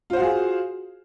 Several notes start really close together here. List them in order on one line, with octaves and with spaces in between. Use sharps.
F4 C5 F#4 F5 G#4